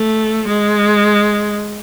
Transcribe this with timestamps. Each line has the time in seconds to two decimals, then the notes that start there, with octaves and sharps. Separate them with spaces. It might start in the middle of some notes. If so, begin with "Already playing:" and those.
Already playing: A3
0.48 G#3